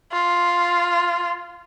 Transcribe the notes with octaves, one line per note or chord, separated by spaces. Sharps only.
F4